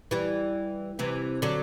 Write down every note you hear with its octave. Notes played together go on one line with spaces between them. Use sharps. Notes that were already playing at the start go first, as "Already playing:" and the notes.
E3 G3
C3 E3
D3 F#3